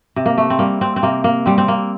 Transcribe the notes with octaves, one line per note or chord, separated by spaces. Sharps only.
C3
A#3
A3
C4
G3 A#3
C4
C4
C3 A#3
A#3
G3 C4
C4
A#3